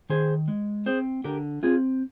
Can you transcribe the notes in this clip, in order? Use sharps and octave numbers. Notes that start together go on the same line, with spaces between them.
D#3 G#4 C5
G#3
C4 G#4 C5
D3 G4 A#4
C4 F4 G#4